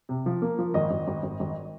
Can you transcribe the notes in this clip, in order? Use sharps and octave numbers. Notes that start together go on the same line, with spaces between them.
C3
F3
A#3
F3
G#1 D#5
G#1
G#1
G#1
G#1